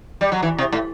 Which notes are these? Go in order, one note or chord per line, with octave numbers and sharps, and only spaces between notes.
G3
F#3
E3
C3
A2